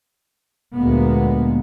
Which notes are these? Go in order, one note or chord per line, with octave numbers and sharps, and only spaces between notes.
D2 A#2 G#3 A#3 B3